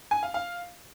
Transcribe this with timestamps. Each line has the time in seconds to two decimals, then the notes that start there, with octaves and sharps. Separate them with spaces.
0.11 G#5
0.23 F5
0.34 F5